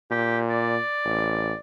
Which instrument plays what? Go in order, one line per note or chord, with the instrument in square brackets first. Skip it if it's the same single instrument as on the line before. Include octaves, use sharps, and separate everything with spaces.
[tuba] A#2 [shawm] G4
[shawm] D5
[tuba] A1